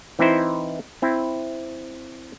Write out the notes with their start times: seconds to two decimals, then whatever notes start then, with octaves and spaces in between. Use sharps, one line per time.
0.19 E3 C4 D#4 E4 C5
1.02 C4 E4